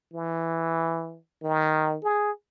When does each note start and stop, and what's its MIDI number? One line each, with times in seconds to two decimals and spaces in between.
0.13 1.17 52
1.43 1.96 51
2.03 2.31 68